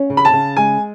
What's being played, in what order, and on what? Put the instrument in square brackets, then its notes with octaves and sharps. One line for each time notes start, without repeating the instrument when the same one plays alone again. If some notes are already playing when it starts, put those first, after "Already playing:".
Already playing: [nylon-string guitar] C#4
C#3
[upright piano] B5
A5
[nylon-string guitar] C#3
[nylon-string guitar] G#3 [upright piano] G#5